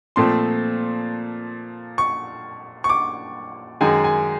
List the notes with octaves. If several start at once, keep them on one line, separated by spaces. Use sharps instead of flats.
A#2 F3 A3 C4 C6
C#6
C#6
D6
F#2 D#3 G#3 G#5
G#5